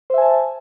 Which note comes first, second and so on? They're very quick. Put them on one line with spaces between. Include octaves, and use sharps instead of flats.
C5 E5 G#5 A5